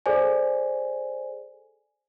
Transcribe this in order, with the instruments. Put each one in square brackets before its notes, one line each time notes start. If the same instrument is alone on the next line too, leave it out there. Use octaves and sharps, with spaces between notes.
[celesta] G#4 A4 C5 D5 G#5